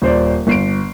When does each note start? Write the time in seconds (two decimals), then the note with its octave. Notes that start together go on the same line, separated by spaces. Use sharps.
0.02 D#1 C5 D5
0.47 G1 C7 D7